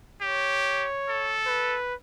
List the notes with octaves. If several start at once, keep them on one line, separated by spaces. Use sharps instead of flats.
G4 C#5
A4
B4